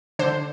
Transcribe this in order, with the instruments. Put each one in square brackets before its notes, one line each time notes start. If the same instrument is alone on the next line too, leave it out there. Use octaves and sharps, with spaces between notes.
[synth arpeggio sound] D3 C5